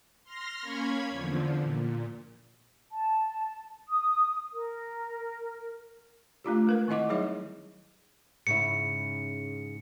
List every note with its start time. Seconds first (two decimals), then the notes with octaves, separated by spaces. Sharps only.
0.24 C6 F6 A#6
0.61 A#3 C#4 C#5 B5 G#6
1.10 E2 D3 F3
1.62 A#2
2.92 A5
3.89 D#6
4.52 A#4
6.44 A3 D4 F4 G4
6.67 G#3 A#4 B4
6.88 D#3 C4 E4 D#5 F#5 D6
7.09 F#3 G3 D#4 G#4 C#5 E5
8.47 G#2 C#3 E4 C#7